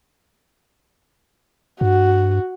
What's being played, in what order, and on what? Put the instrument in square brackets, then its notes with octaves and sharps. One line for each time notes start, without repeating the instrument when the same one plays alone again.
[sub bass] G2 [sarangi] F#4